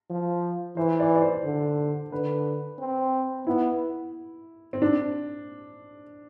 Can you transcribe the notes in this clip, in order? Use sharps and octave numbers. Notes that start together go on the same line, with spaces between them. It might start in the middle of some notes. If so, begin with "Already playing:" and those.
F3
E3 C5
D5
D5
C5
D3
D3 B4
C4
B3 E4
C4
D4